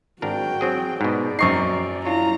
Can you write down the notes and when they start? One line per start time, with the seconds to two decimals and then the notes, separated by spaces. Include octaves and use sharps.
0.22 G#1 D4 F#4 A#4 G5
0.61 F#3 C4 G#4
1.01 G#2 B2 D5
1.39 A#1 F#2 C4 D#4 C#6 C7
2.05 D4 E4 F4 C#5 A#5